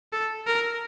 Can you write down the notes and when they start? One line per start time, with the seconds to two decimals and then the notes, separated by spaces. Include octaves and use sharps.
0.13 A4
0.47 A#4